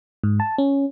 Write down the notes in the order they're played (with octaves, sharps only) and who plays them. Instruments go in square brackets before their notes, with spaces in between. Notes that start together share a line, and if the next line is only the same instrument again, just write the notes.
[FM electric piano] G#2
A5
C#4